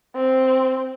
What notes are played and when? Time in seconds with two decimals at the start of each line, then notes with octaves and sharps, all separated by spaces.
0.15 C4